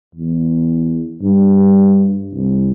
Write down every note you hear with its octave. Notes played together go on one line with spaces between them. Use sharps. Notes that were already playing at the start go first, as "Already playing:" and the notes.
E2
G2
C2